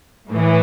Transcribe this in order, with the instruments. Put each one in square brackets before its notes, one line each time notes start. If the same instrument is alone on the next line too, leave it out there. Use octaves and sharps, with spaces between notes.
[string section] A2 E3